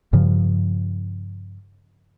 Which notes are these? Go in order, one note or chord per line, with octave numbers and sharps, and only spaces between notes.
G2 C#3 F3